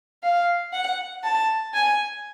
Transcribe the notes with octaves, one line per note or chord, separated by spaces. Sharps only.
F5
F#5
A5
G#5